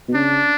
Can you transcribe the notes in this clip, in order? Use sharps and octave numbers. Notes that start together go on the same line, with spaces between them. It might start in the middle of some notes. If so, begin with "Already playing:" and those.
B2
C#3 D4